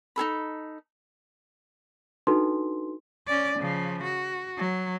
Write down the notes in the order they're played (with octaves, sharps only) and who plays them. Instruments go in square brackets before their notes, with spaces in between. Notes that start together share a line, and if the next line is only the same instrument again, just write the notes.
[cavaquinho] D#4 G#4 A4 B5
[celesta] D4 D#4 F#4 A4 B4 C6
[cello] C#4 D5
C#3 F3
F#4
F#3